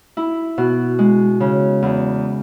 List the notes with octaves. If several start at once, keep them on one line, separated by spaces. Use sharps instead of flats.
E4
B2
G#3
C#3
E2